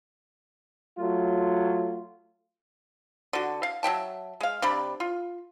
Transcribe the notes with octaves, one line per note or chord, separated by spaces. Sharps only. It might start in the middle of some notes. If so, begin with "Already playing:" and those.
F#3 A3 F4
D3 F#4
F5
F#3 E5 G5 A5
G#3 F5
C3 G3 D4 B5
F4